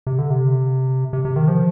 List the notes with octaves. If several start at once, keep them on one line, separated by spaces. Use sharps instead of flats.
C3
D3
C3
C3
C3
D#3
F3